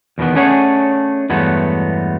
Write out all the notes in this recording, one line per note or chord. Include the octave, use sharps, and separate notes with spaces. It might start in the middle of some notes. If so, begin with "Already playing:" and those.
E2 B2 D#3 B3
A3 C#4 D4 G#4 C#5 F#5
E2 G2 F#3 G#3 A3 B3